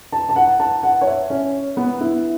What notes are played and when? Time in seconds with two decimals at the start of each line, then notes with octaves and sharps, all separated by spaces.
0.12 A5
0.29 A5
0.36 F#5
0.60 A5
0.83 F#5
1.01 C#5
1.06 E5
1.30 C#4
1.77 B3
2.01 E4